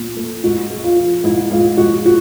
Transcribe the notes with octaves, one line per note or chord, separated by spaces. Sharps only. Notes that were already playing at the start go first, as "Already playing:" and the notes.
Already playing: A#2
A3
G#2 F#4
G#3
F4
F3
G#2 E4
G#2 F4
G#3 F#4
F#4